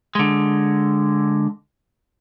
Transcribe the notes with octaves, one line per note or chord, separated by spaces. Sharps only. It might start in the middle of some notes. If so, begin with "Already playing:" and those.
D3 G#3